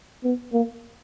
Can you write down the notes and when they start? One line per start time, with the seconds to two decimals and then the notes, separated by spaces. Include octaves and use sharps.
0.24 B3
0.53 A#3